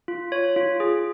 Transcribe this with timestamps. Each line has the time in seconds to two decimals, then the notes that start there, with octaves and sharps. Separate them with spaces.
0.08 F4
0.32 C#5
0.56 F4
0.80 G#4